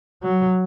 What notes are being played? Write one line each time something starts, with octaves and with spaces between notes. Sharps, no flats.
F#3